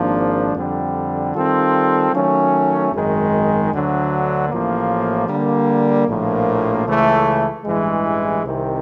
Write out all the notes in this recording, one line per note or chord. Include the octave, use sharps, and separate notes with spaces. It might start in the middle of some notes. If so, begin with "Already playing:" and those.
Already playing: G#1 G#2 F3 A#3 D4
F2 D3 G3
D#3 G3 C4 F4 A4
D#3 F#3 A3 C#4
G#1 F#2 D#3 G#3
D2 D3 F#3
A1 A2 F3 A#3
D3 G3 A#3
A#1 A2 F3 A#3
C#2 C#3 E3 A3
A1 G2 E3 G#3
C2 C3 D#3